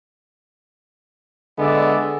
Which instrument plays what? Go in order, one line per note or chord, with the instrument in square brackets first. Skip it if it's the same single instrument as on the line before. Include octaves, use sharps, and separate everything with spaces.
[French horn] D3 [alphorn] G#3 [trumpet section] B3 D5 E5